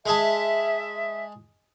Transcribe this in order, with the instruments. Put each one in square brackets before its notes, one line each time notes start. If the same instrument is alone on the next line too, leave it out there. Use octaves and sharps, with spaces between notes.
[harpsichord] G#3 G#4 A5 [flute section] E5